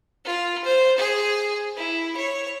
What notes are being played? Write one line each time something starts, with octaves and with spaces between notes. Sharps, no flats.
F4
C5
G#4
E4
C#5